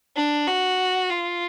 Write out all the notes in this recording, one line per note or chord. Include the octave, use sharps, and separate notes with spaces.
D4
F#4
F4